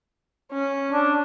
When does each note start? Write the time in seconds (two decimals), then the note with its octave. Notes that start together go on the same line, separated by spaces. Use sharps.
0.51 C#4
0.92 D4